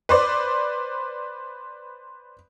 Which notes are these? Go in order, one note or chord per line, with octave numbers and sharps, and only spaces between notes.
B4 C5 D5